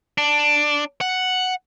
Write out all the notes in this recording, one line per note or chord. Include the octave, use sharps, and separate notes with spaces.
D4
F#5